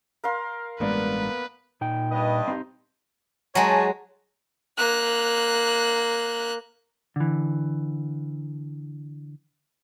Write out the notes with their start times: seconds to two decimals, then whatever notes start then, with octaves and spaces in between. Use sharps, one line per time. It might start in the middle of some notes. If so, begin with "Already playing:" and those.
0.24 A#4 F5 C6
0.80 A1 G2 G#3 A#3 B3 B4 D5
1.81 A#2 D#4 G5
2.11 G2 B4 D#5
2.48 C4 D#4 G4
3.55 F#3 G#3 C#5 G#5 A5
4.78 A#3 F#6
7.16 D3 E3